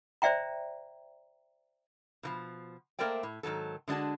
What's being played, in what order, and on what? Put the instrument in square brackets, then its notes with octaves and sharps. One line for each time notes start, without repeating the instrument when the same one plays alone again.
[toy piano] C5 D5 E5 G5 A#5
[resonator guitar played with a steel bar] B2 E3 F3
A3 A#3 A#4 C5 D5 G5
A2
G#2 D#3 F#3 A4
D3 G#3 D4 F#4 A5